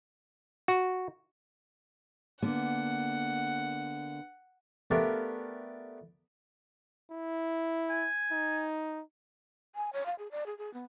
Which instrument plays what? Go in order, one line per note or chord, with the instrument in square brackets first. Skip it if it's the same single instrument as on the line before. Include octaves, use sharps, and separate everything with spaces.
[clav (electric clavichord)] F#4
[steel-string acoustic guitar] D3 A#3 B3 [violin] F#5
[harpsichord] A3 B3 D4 G4 A#4 F5
[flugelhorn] E4
[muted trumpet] G#5
[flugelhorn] D#4
[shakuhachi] G#5
C#5
F5
G#4
D5
G#4
G#4
B3